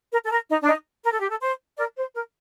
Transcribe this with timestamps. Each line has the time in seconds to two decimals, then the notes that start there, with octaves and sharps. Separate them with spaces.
0.12 A#4
0.25 A4
0.31 A#4
0.49 D#4
0.63 D4
0.66 D#4
1.04 A#4
1.12 A4
1.21 G4
1.30 A4
1.41 C5
1.77 A#4 D5
1.97 C5
2.14 A#4